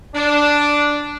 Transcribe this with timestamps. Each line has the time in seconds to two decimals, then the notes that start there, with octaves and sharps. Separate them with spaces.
0.15 D4